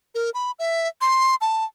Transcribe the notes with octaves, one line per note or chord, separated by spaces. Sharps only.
A#4
B5
E5
C6
A5